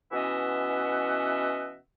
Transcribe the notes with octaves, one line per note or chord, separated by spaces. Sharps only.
B2 E3 C#4 D#5 E5 F#5